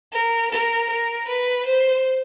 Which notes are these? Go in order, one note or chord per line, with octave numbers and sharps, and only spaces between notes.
A#4
A#4
A#4
B4
C5